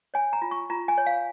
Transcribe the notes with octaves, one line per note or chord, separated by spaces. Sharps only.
C#5 G#5
A#5
F4
C#6
F4 A#5
G#5
C#5
F5